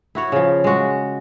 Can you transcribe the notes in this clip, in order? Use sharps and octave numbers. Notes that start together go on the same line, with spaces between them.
E4 F#4 C#5
C#3 F3
G#3 F#4